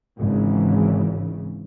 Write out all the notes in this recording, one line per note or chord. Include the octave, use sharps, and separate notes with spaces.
G#1 C#3 E3